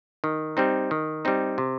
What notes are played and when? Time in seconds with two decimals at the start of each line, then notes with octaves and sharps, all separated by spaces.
0.24 D#3
0.57 G3 C4 D#4
0.91 D#3
1.25 G3 C4 D#4
1.58 C3